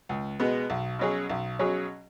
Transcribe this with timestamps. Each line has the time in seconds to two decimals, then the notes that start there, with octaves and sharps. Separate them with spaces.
0.09 C#2
0.40 B2 G#3 B3
0.70 B1
0.99 B2 F#3 C#4 G#4
1.30 B1
1.59 B2 F#3 C#4 G#4